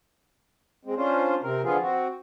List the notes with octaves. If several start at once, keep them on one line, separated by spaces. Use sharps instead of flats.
G#3 C4
C#4 D4 F4 C5
C3 C4 A#4
D3 F3 B3 F4 G#4
C4 F#4